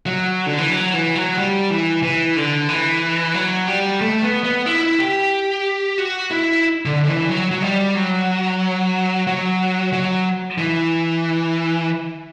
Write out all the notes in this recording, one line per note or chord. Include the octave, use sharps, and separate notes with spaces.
F#3
D3
E3
F#3
E3
F#3
G3
E3
E3
D3
E3
F#3
G3
A3
B3
B3
E4
G4
F#4
E4
D3
D3
E3
F#3
F#3
G3
F#3
F#3
F#3
E3